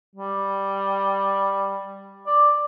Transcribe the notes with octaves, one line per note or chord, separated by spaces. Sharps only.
G3
D5